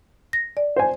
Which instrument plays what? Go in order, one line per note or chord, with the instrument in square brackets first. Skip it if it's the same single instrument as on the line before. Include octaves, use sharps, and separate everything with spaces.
[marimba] A#6
D5
[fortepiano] C5 G#5